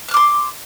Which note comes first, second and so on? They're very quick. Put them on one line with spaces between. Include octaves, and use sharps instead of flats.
F#6 F6 D6 C6